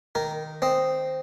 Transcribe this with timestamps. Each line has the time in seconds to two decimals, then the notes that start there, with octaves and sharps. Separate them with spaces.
0.15 D#3 A#4
0.62 C4 D#5